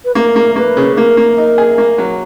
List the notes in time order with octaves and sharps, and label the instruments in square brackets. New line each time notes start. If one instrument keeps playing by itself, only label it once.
[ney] B4
[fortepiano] A#3 [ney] A#4
[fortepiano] A#3
[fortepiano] A#3 [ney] B4
[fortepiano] C#3
[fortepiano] A#3 [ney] A#4
[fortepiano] A#3
D#4
G#4
A#3
F#3